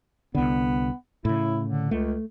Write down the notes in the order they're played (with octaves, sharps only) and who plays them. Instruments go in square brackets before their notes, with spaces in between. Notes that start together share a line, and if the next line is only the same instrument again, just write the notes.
[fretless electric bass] C2 D3 [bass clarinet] B3
[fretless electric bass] A2 C#3 [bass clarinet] E4
[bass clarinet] D3
[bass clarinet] C#2 [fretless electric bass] A3